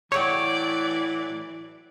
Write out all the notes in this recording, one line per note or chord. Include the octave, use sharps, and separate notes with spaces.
A2 E3 F#3 C#5 D5 G5